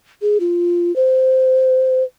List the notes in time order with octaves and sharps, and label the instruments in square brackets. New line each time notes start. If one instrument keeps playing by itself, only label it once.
[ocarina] G#4
F4
C5